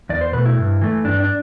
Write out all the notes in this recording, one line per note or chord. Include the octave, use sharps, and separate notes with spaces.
E2 D5
C5
B2 A3 B4
E4
G2
E3 A3
G2 D4
D4